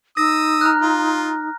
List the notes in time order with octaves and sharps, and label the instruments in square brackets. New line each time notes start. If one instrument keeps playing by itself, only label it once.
[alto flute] D#4 [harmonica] D#6 E6 [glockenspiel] A#6
[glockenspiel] A#5 F6 F#6
[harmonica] F4